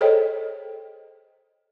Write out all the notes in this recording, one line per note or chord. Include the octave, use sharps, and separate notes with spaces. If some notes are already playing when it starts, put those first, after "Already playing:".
G#4 A4 C5 C#5 D#5 G5